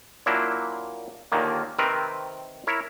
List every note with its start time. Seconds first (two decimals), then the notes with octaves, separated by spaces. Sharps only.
0.26 A#2 F#3 A#3 D4 E4
1.32 D#2 A#2 D3 D#3 A#3
1.78 C3 D#3 C4 A#4 B4
2.67 E4 A#4 C#5